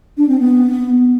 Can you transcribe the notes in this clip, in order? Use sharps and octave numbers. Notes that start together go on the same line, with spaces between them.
D4
C4
B3